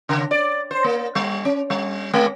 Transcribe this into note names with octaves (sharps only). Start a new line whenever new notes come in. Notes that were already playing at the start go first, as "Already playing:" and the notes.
C#3
D5
C5
A#3
G3
C#4
G3
G#3